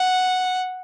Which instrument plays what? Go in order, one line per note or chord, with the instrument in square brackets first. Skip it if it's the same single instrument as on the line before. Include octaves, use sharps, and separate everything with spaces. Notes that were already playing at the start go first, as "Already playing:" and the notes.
Already playing: [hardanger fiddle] F#5